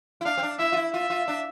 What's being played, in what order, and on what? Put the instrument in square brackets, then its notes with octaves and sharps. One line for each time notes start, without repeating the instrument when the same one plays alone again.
[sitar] E4
[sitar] D4 [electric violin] F5
[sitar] C4
D4
[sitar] E4 [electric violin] E5
[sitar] F4
E4
[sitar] F4 [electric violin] E5
[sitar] F4
D4